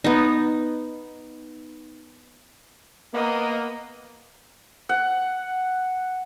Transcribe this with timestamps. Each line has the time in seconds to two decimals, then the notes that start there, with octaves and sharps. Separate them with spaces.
0.04 B3 D#4
3.14 A#3 B3 D#5
4.89 F#5